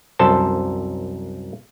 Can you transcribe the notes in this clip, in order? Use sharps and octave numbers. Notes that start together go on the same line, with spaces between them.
C2 F#2 A4 C5 A5